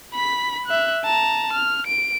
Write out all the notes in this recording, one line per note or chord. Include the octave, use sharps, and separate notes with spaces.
B5 B6
E5 F#6
A5 A#5
F6
D7